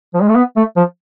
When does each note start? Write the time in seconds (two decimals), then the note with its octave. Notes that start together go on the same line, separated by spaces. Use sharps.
0.14 F3
0.22 G#3
0.29 A3
0.36 B3
0.56 A3
0.76 F3